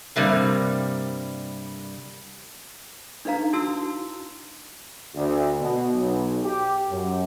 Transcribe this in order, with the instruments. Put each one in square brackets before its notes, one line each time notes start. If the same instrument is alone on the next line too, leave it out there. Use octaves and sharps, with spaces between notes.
[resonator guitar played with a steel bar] G2 C3 G3 A#3
[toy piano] D4 D#4 B4 F5 A#5
D4 E4 F#4 A5 A#5 E6
[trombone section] D2
B2
B1
G4
F#2